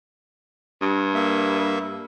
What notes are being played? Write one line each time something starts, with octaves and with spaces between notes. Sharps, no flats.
G2
A#3 E5